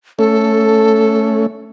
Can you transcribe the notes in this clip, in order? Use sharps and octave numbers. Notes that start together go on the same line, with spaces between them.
A3 C#4 A4